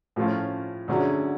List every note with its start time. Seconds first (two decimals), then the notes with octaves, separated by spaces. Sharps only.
0.16 A2 F3 A3 C#4 F4
0.88 D2 D3 F#3 C#4 G#4